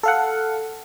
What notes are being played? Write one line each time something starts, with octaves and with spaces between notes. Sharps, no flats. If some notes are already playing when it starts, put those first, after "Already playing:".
A4 F5 F#5